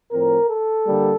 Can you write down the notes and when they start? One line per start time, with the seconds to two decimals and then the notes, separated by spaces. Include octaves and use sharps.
0.12 A2 F3 C4 A#4
0.50 A4
0.87 D3 G3 A#3